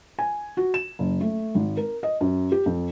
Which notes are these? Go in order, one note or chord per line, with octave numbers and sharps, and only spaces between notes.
G#5
F#4
E7
F#1
A3
G#1
A#4
D#5
F#2
G4
F2